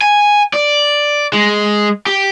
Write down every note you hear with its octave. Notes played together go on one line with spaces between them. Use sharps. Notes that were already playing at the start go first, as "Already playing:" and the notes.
G#5
D5
G#3
G4